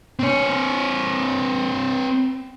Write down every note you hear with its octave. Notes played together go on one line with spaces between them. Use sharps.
C4 C#5